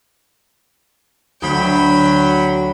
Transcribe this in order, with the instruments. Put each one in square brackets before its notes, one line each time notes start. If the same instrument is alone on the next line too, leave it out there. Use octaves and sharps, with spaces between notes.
[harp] D2 [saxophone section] F#3 [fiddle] G5 B5